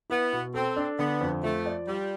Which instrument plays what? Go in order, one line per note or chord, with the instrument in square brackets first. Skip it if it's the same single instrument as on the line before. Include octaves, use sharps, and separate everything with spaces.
[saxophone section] B3 [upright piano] E4
[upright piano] B2
[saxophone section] C4 [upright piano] A4
[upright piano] D4
[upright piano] D3 [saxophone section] B3
[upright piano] F2
[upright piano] F3 [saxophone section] A3
[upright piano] D5
[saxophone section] G3 [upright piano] F4